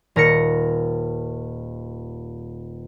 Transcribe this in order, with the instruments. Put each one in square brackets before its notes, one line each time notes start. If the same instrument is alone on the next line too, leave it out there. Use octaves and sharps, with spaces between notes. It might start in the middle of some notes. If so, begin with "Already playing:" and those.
[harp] D#1 A#4 A#6 C#7